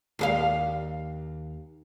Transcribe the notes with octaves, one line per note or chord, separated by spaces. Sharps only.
D#2 G#4 F5